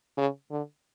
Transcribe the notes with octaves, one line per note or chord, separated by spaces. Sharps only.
C#3
D3